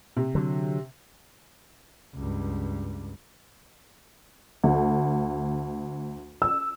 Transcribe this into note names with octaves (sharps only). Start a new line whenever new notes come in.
C3
D3 F#3
C#2 G2
D2
E6